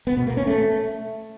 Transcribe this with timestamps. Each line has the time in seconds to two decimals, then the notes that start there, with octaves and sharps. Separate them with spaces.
0.07 B3
0.17 B2
0.27 A#3
0.37 C#4
0.47 A3